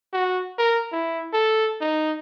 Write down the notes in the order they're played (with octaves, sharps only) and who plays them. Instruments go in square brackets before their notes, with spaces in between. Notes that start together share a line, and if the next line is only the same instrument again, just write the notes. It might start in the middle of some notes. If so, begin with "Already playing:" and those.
[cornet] F#4
A#4
E4
A4
D#4